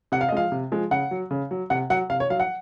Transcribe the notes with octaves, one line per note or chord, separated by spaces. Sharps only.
C3 F#5
F5
D#5
F3 G#3 F5
C3
F3 G#3
C#3 F#5
F#3
C#3
F#3
C3 F#5
F#3 F#5
C3 F5
C#5
F#3 F5
F#5